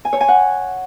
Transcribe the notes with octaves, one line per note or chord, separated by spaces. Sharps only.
G#5
C#5
G#5
F#5